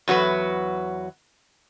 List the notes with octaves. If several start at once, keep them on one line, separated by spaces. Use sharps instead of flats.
E2 F#3 F#4 B4